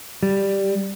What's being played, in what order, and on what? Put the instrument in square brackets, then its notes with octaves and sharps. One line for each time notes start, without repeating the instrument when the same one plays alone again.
[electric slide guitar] G3